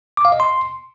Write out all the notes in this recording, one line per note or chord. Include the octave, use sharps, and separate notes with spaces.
D6
F5
D#5
C6